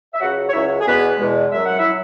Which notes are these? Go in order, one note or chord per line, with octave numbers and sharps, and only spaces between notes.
E5
C#2 C#3 F#3 F#4 F#5
C#5
C#2 C#3 F#3 E4 E5
G#4
E2 B2 G#3 B3 B4
E2 B2 G#3
F#2 F#3 E5
F#5
E4 E5
F#3